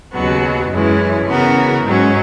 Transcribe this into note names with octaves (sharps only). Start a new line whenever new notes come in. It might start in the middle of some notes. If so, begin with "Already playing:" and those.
D#2 C#3 F#3 B3 F#4
F#2 E3 G#3 C#4 E4
C#3 E3 B3 F#4 A#4
G#2 F#3 C#4